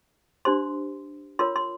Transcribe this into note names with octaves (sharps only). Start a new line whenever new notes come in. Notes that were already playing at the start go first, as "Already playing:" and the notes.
D4 G4 C5 C6
F4 A#4 C#5 C6
C6